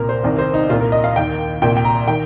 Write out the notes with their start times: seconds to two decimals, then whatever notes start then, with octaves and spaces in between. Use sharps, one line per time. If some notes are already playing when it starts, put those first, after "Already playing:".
Already playing: C2 A#2 A#4
0.09 C5
0.23 C2 C3 D#3
0.39 C5
0.54 D#4
0.69 C2 A#2 F4
0.81 A#4
0.92 D#5
1.04 F5
1.16 D#2 D#3 G5
1.62 C2 A#2 G5
1.77 G5
1.85 A#5
2.08 D#3 G5